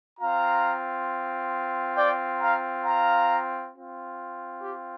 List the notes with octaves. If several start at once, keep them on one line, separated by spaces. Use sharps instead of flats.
C4 F4 F5 A#5
D5 G5
F5 A#5
F5 A#5
C4 F4
G4